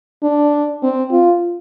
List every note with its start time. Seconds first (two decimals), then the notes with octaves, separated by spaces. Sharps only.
0.23 D4
0.83 C4
1.12 F4